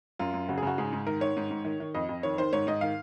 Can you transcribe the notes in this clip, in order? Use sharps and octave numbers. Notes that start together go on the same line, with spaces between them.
F#2 F4
F#2
C#3 F#4
G#4
C#3 F#4
G#2 G#4
G#2
D#3 A#4
D#3 C#5
G#2
G#2
D#3
D#3
F2 D#5
F2
D#3 C#5
D#3 C5
G#2 C#5
G#2 D#5
D#3 F5